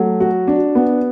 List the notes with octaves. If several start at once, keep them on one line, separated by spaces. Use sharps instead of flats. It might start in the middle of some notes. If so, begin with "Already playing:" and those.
Already playing: F#3 A3
F#4
D4
B3